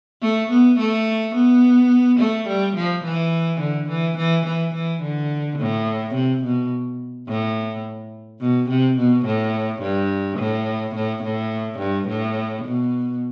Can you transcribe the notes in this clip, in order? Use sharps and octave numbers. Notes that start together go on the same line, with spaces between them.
A3
B3
A3
B3
A3
G3
F3
E3
D3
E3
E3
E3
E3
D3
A2
C3
B2
A2
B2
C3
B2
A2
G2
A2
A2
A2
G2
A2
B2